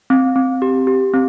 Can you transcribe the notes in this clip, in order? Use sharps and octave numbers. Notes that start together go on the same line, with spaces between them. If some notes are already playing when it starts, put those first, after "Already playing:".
C4
C4
G4
G4
C4